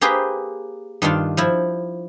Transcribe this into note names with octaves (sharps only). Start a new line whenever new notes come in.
A#3 G4 G#4 B4 C5
G2 D#3 D4 F4
F3 E4